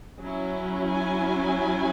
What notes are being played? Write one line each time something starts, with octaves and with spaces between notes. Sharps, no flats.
F#3 C#4 E4
G#5